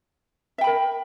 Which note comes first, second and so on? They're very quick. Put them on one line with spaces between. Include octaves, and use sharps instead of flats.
E5 G5 B5 A#4